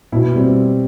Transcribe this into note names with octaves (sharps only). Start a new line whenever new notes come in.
B2 E4
G3 C4